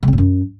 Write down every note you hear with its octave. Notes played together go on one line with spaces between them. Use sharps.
C#3
C4
A2
F#2